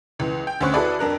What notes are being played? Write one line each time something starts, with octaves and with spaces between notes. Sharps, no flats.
C#2 E3
G5
D2 C#4 C5 C#6 F#6
E4 F#4 G#4 A4 B4 D5
F2 D4 A#4 F#6